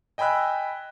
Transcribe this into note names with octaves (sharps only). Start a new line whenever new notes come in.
D#5 G5 G#5 B5 E6 F#6